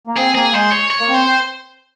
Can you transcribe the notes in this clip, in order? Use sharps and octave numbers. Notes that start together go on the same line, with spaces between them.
A#3
C4 G#4
A#3 G#4
G#3 C5
C#5
C#5
A#3
C4
C5